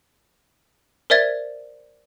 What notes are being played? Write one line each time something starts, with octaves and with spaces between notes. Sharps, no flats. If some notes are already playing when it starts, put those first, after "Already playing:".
A#4 C5 D5 E5 G#6 A6